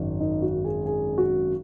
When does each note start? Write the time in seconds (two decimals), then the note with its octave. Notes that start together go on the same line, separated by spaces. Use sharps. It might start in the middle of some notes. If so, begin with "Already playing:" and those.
Already playing: G#1 F#2 D#3
0.20 D#4
0.42 F#4
0.65 G#4
0.86 G#4
1.18 F#4